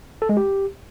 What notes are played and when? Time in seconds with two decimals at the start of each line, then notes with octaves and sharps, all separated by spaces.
0.22 A4
0.29 G#3
0.37 G4